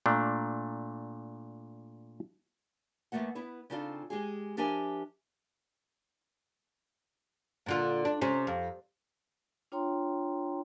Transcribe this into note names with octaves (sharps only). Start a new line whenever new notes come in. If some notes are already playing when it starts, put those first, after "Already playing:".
A#2 A3 D4
E2 C#3 A3 A#3 F#5
B3 E4 B4
C#3 C4 D4 D#4 F4 A4
G#3 G4 G#4
F3 D4 G4 A#4 E5 G#5
A#2 D3 F4
D4
C3 C#4
F2
D4 F4 C#5 G5 A#5 C6